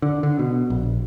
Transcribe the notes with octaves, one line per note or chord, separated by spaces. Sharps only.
D3
D3
B2
A#1